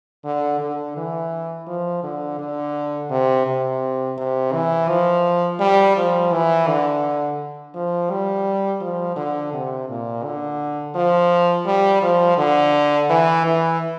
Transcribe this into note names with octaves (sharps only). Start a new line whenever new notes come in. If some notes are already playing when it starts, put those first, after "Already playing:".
D3
D3
E3
F3
D3
D3
C3
C3
C3
E3
F3
G3
F3
E3
D3
F3
G3
F3
D3
C3
A#2
D3
F3
G3
F3
D3
E3
E3